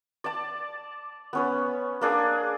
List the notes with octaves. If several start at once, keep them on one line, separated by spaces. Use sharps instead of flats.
D5 A5
B3 C#4 B4
A#3 D4 G#4